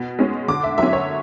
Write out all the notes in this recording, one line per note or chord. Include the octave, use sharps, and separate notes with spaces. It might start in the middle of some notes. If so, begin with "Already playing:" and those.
Already playing: B2
G#3 C#4
D3 D6
E5
F#3 C#4 E5
C#5